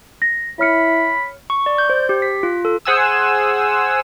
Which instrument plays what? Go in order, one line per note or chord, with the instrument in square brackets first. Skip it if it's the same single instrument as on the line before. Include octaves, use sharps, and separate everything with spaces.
[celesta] A#6
[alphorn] E4 [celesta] C#5 F6 C#7 [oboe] B5
[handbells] C#6
D5
G6
C5
G4
B6
F4
A4
[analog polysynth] G#4 C5 F#5 G#5 D#6 E6